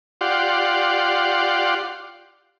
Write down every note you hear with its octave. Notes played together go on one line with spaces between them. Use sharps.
F4 G4 D5 F#5 C6